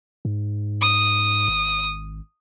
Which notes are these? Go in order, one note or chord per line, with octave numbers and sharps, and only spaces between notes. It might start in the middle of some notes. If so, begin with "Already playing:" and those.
G#2
D#6
G#1